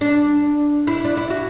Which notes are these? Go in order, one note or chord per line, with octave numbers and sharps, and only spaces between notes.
D4
E4
D4
E4
F#4